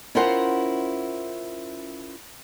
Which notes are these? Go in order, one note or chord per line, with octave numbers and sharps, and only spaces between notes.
C#4 E4 F4 A#4 C5 F#5